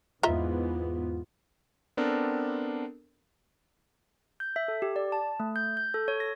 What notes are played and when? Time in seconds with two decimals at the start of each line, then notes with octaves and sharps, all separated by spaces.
0.23 E2 G#2 E3 B3 F4 D#5 E5 A#5
1.97 B3 C4 D4 A4 A#4
4.40 G6
4.56 E5
4.68 A4
4.82 G4
4.96 D5
5.12 A5
5.40 A3
5.56 G6
5.77 G6
5.94 A4
6.08 C#5
6.20 A#6